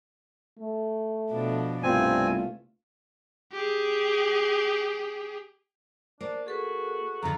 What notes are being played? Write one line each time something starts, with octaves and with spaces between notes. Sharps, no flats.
A3
B2 F3 D4
C2 G2 A3 B3 C4 F4 G#5
G4 G#4
A#3 D4 C5 D5
F#4 G#4 A4 B4
F2 D3 F4 A#5